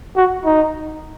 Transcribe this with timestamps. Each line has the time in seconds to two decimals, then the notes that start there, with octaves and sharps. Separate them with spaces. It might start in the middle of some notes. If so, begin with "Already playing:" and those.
0.16 F#4
0.45 D#4